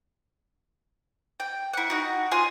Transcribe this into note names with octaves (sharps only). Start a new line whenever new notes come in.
G5
E4 F#5
D#4 F#4
F4 G#4 G#5 C6